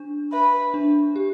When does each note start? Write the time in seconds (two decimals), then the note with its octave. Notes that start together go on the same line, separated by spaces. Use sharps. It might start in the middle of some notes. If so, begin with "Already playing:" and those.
Already playing: D4
0.32 B4 E5
0.74 D4
1.16 G4